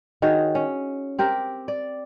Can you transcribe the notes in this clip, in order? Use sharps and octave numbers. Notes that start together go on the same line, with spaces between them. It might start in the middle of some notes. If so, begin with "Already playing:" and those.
D#3 F#4 G#4 C#5
C#4
C4 G4 A#4
D5